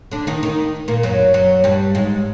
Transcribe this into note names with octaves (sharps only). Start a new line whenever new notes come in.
D3 D4
D#3 D#4
D#3 D#4
A#2 A#3
F#2 F#3
F#2 F#3
G2 G3
G#2 G#3